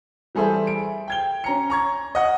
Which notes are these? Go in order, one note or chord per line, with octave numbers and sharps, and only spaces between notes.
E3 G3 G#4 A4 C5 E5
D7
G5 G#6 G7
C#4 A#5 C#7
A#5 C#6 G#6
D#5 F#5